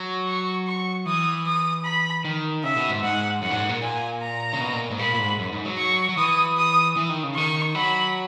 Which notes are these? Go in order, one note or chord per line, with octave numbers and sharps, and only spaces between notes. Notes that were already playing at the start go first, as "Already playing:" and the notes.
Already playing: F#3
C#6
C#6
E3 D#6
D#6
B5
D#3
C#3 E5
B2
G#2
G#2 F#5
F#2 F#5
A#2
G#2
A#2
A#2 G#5
A#5
C#3
B2
A#2
G#2
A#2 B5
A#2
G#2
F#2
G#2
F#3
C#6
F#3
E3 D#6
D#6
E3
D#3
C#3
D#3 C#6
F#3 B5